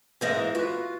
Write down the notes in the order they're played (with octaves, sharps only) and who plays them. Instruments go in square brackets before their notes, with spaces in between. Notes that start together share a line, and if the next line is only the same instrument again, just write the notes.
[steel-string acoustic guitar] G#2 E3 A#3 [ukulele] C5 D#5 E5
[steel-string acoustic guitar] F4 [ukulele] F#4 B4